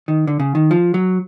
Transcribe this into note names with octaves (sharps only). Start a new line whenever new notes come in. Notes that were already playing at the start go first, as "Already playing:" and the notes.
D#3
D3
C#3
D#3
F3
F#3